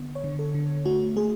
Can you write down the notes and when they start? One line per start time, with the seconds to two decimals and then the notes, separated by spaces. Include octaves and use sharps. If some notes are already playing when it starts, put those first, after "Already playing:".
Already playing: D3 B3
0.15 C#5
0.24 D3
0.39 A4
0.55 D3
0.85 A3 F#4
1.16 A3 G#4